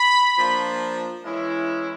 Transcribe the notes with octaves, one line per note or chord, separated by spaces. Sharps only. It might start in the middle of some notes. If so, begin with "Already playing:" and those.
Already playing: B5
F3 A#3 D4 F4
E3 G#3 C#4 E4